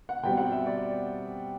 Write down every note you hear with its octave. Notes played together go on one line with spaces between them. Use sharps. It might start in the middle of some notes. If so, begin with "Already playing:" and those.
F#5
B2 G3 C4 G5
F#5
E5
D5